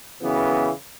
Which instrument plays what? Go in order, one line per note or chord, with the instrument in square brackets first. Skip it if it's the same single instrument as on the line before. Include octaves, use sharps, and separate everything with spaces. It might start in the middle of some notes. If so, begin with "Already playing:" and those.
[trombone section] F#2 C#3 E3 B3